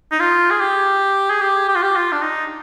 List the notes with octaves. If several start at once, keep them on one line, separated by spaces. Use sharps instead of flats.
D#4
F4
G#4
G4
G#4
G4
G4
F4
G4
F4
D4
D#4